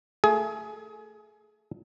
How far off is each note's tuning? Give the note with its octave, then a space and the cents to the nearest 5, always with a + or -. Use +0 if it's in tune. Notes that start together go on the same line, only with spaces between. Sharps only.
A3 +20 G#4 +25